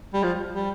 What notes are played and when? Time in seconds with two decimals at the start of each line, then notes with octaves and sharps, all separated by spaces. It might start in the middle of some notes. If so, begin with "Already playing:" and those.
0.13 G3
0.23 F3
0.52 G3